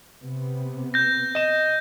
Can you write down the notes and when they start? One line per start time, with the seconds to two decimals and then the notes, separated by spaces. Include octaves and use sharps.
0.22 C3 B3
0.94 G6 A#6
1.35 D#5 E7